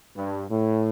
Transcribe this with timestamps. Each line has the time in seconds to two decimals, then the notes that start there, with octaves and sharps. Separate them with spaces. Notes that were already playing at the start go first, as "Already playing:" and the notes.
0.16 G2
0.50 A2